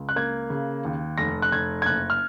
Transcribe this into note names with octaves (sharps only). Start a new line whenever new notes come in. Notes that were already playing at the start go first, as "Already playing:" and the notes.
Already playing: C#2
F#6
A#3 G#6
C#3
D#2
F1 A#6
F#6
F1 G#6
G#6
F#1 F#6
F6